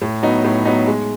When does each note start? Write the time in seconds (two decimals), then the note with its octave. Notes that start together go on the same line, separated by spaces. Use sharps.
0.02 A2
0.23 F#3 B3 D#4
0.44 A2
0.65 F#3 B3 D#4
0.87 G#3